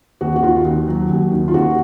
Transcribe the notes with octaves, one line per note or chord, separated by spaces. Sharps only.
D#2 F#4
F#4
D#3 F4
D#2
F#3
D#2
D#3
F4
D#2 F#4